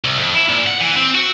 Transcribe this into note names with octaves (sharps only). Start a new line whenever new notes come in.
C2
F2
E4
A#2
F#5
E3
C4
F#4